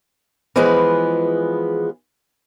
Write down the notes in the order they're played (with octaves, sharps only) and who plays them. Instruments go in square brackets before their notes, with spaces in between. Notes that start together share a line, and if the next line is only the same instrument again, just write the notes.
[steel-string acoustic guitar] E3 F3 G#3 B3 G#4 B4